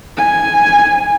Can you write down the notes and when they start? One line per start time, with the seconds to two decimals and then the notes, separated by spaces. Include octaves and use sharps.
0.18 G#5